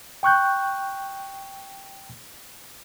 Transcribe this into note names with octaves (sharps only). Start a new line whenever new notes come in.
G5 C#6 F#6 G6